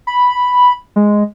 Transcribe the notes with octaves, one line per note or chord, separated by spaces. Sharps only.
B5
G#3